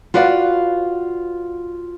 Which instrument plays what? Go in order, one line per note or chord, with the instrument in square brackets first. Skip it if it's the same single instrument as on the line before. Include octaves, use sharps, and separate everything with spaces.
[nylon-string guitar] F4 F#4 B4 D5 F5 F#5